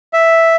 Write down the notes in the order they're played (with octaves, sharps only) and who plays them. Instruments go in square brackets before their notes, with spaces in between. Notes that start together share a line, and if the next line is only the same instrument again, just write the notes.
[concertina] E5